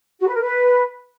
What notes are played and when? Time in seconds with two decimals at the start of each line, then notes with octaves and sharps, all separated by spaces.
0.20 F#4
0.27 B4
0.34 A#4
0.41 B4